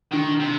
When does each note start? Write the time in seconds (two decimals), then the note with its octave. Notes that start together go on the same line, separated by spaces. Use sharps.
0.12 D3 D#3
0.40 C3